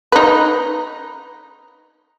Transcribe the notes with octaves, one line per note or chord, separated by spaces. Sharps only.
D#4 B4